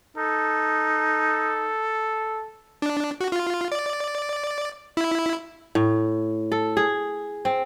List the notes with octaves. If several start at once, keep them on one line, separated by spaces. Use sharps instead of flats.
D#4 A4
D4
F#4
F4
D5
E4
A2
A4
G#4
C4